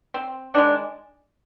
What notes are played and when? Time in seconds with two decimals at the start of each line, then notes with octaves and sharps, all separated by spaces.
0.14 C4
0.54 D#3 G#3 D4